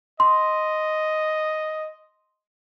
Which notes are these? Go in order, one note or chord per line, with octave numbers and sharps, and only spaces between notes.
D#5 C6